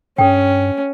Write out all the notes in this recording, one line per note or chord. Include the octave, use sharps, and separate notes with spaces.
G2 C#4 A4 G5